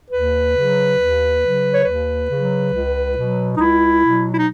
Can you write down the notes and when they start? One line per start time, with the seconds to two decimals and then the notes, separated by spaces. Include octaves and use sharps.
0.10 D#2 B4
0.54 C#3 F#3
0.97 D#2
1.42 C#3 F#3
1.74 C#5
1.84 D#2 B4
2.29 C#3 F#3
2.72 C#2
3.15 B2 F#3
3.55 D#4
3.59 C#2 E4
4.03 B2 F#3
4.32 E4
4.39 D#4